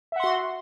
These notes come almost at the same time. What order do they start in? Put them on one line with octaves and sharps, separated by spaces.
E5 F#5 C6 F#4